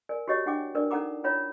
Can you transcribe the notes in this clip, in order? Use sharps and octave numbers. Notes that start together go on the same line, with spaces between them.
A#4 D5 G#5
F#4 G4 C#5 D#5
D4 E4 F#5 G5 D6
D4 A#4 B4 D5
C#4 D#4 A4 F#5 A#5 D6
C#4 E4 F4 C#5 A#5